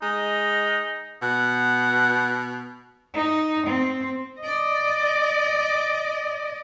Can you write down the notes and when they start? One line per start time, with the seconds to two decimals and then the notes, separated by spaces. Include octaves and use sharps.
0.02 G#3 D#4
1.22 B2 F#5
3.14 D#4
3.66 C4
4.40 D5 D#5